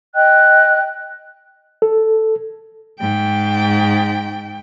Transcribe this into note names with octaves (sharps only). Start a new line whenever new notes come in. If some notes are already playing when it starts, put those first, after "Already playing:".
D#5 G5 F#6
A4
G#2 G5